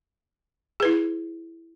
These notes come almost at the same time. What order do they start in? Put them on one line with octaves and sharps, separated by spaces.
G#4 B4 E4